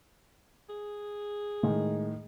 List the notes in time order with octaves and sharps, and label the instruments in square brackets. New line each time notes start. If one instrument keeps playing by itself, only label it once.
[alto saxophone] G#4
[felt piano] A2 D#3 [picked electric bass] G#3